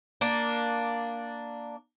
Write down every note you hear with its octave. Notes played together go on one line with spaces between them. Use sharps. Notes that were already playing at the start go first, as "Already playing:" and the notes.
A#3 D4